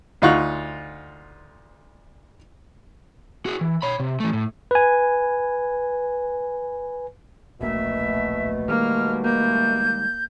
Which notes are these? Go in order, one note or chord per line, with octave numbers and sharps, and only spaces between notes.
D2 D#4 F4 F#5 C#6 F#6
F#4 G#4
E3
C#5 B5
C3
E3 A3
A2
B4 G#5
D1 A#1 B2 A3 A#3 E5
D#3 G3 G#3 A#3 F6
A#3 G6